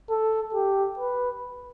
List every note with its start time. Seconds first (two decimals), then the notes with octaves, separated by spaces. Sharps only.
0.10 A4
0.55 G4
0.99 B4